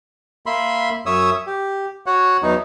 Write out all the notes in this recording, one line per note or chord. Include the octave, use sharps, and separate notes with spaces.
A#3 E5 B5 C6
F#2 C#5 E5 D#6 E6
G4
F#4 C#5 F#5
E2 E3 F#3 D#4